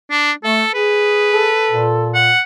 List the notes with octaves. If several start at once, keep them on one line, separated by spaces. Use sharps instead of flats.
D4
A3 A4
G#4 B4
A4
A#2
F#5